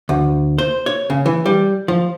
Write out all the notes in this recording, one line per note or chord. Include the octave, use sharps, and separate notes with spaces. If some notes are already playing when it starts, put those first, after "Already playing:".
D2
C5
C#5
C#3
E3
G3
F3